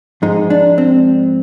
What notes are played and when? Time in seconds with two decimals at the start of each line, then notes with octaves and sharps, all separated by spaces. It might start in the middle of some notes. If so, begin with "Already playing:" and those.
0.22 G#2 F3 G#3 D#4
0.50 D4
0.78 C4